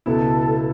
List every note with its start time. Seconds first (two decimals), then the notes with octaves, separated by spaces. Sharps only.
0.06 C#2 B2 B3 E4 A4